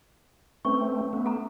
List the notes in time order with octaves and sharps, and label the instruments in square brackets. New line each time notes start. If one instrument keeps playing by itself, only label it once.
[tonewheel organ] A3 C4 [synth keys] C#4 B4 [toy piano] C#6
[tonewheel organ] A3 B3
[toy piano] A4 A#5